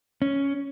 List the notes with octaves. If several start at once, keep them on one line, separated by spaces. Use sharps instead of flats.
C#4